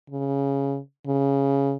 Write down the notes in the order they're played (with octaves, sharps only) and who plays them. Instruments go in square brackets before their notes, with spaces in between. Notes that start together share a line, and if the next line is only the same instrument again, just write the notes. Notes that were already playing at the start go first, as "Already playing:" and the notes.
[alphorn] C#3
C#3